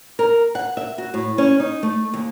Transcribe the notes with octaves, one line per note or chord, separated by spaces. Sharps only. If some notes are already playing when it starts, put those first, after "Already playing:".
A#4
F#5
E5
F#4
A2
C#4
D#4
A3
D#2